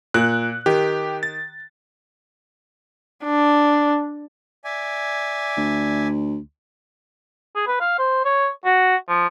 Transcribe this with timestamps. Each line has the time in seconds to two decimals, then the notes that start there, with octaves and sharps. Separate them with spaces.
0.14 A#2 F#6
0.66 D#3 G4
1.23 A6
3.24 D4
4.65 D5 E5 G#5
5.58 D2
7.55 G#4
7.67 B4
7.81 F5
7.99 C5
8.25 C#5
8.65 F#4
9.08 F3